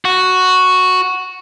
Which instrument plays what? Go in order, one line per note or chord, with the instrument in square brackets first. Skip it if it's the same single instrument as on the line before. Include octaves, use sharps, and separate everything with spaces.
[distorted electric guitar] F#4